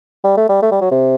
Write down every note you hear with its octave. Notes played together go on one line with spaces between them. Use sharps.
G3
A3
G3
A3
G3
F#3
C3